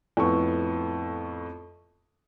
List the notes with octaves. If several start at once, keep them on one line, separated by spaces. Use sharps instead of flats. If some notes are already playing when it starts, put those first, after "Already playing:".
F2 A2 B3 C#6